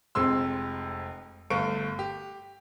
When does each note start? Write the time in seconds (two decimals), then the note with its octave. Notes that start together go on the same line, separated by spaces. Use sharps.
0.15 F1 F2 G#3 C6 E6
1.50 G1 A3 F5 C#6 D7
1.99 G4